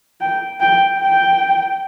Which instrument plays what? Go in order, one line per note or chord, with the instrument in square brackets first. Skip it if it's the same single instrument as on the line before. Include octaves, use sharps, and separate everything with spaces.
[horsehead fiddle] G5
G5
G5